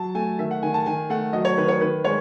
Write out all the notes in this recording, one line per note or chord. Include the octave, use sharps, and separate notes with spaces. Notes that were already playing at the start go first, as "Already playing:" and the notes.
Already playing: F#3 A5
A3 G#5
D#3 E5
F#5
D#3 G#5
A5
D#3 G#5
A3 F#5
F#3 D#5
C#5
D#3 B4
C#5
D#3 B4
G#3 C#5